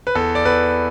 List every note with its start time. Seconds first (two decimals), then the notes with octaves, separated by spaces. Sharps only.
0.07 B4
0.15 E2 A4
0.35 D5
0.45 E2 B4